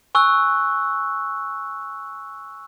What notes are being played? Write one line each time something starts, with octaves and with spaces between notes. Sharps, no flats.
G#5 C#6 E6 F#6 G7